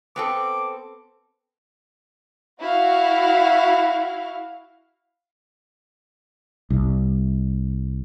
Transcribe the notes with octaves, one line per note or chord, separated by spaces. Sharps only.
B3 C4 A4 D6
E4 F#4 F5
C2